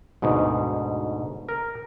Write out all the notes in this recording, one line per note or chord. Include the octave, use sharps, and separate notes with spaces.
D2 G#2 B2
A#4